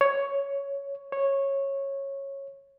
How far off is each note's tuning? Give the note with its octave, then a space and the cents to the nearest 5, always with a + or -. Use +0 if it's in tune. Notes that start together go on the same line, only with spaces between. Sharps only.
C#5 +5
C#5 -15